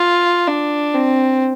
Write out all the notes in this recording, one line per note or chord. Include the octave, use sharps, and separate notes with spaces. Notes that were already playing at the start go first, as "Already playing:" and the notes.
Already playing: F4
D4
C4